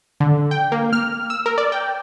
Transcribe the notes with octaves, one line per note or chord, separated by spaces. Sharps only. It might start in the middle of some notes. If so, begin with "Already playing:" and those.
D3
G5
A#3
F6
E6
A#4
D5
G5